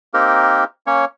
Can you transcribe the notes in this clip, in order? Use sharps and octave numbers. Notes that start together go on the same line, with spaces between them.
A#3 C4 D#4 G4 A#4
A#3 C#4 C#5